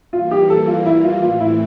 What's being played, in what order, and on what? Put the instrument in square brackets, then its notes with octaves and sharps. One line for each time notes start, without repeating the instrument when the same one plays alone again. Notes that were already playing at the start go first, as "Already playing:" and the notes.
[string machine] E3 G3 A#3 [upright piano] F4
[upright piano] G4
A4
F4
E4
F4
[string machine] A2 E3 A3 C4 [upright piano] F4
[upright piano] E4